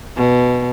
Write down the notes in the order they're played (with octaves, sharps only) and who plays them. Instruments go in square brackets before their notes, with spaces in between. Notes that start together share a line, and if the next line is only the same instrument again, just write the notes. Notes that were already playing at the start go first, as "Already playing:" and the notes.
[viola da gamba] B2